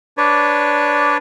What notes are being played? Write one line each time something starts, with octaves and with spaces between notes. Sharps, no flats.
D4 B4 C#5 D5